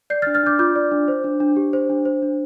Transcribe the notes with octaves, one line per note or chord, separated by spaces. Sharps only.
D5 G6 C7
F6 A6
D4
F6 A6
D4 D6 G6
F4 D6 G6
D5
D4
C5
D4
D4
G4
C5
D4
C5
D4